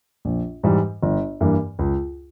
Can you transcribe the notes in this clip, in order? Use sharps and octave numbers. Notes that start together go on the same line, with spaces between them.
A#1
G#2 E3 G3
G1
G2 E3 A#3
C#2